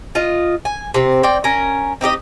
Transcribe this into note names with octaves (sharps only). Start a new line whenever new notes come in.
F4 D#5
G#5
C3 C4
C4 D5 G5
C#4 A#4
C4 D#4 G4 D#5